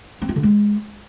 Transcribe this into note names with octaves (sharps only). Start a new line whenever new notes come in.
C4
F4
D3
G#3